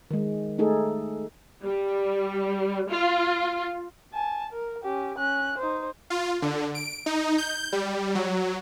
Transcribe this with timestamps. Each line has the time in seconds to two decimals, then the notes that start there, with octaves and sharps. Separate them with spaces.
0.11 D#3 G#3
0.59 A3 D#4 G#4 A4
1.63 G3
2.89 F4
4.13 G#5 A5
4.52 A#4
4.83 C#4 G4
5.17 C#4 F#6
5.58 D#4 C5
6.10 F4
6.42 D3
6.75 D7
7.06 D#4
7.38 G6
7.73 G3
8.15 F#3